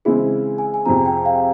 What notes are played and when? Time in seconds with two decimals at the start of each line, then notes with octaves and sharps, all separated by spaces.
0.05 C#3 E3 G#3 C4 E4 G#4
0.58 G#5
0.74 G#5
0.86 F2 C3 F3 C4 A#5
1.05 G5
1.25 F5